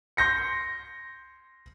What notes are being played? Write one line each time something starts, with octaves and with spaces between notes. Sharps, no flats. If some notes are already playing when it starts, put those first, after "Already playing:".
C6 G6 A#6 C#7